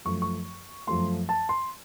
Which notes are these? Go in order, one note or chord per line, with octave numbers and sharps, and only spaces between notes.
F#2 F3 A3 C#6
C#6
F#2 F3 A3 C6
A5
C6